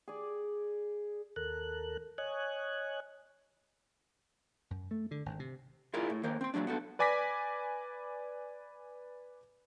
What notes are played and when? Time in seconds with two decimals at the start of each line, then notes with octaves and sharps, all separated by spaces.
0.08 G#4 D5
1.36 D#2 A4 A#4 F#6
2.18 C#5 D#5 G#5 F#6
4.71 F#2
4.91 A3
5.11 D3
5.26 G#1
5.39 C3
5.94 E4 F4 G#4 A#4 D5
6.10 A2
6.23 D#3 A#3 A#4 C5
6.41 C4 C6
6.54 A#2 C#3 F#3 G#3 D4
6.67 B3 F#4 A4
6.99 B4 D5 G#5 D6 A#6 B6